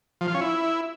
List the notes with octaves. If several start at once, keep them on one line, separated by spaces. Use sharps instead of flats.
F3
F4
C#4
E4